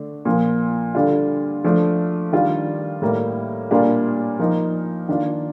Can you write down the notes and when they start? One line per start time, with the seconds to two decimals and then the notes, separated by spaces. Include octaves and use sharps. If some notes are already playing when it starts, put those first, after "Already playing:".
Already playing: D3 A3 D4
0.25 A#2 F3 A#3
0.95 D3 G3 D4 F4
1.64 F3 A3 D4
2.33 D#3 G3 D4 F4
3.02 A2 G3 A#3
3.71 A#2 G3 A#3 D4 F4
4.39 F3 A#3 D#4
5.09 D#3 A#3 D4 F4